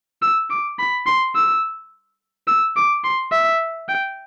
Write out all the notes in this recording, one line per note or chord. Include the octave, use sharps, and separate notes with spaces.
E6
D6
B5
C6
E6
E6
D6
C6
E5
G5